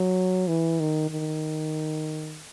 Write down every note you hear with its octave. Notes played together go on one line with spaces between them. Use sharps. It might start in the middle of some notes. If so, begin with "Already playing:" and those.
Already playing: F#3
E3
D#3
D#3